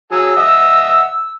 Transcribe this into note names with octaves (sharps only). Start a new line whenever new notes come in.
F#3 G#4 G#5 E6
D#5 E5 F#5